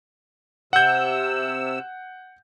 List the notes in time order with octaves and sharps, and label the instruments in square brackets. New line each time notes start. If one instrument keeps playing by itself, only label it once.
[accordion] C3 E6 [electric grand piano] F#5 G6